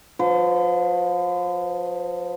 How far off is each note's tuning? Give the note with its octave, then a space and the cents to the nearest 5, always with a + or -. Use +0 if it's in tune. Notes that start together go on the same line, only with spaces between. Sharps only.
F3 +30 C5 -45